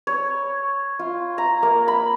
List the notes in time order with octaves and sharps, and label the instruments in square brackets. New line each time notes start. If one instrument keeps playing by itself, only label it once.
[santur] C#5
F4
A#5
A#3
B5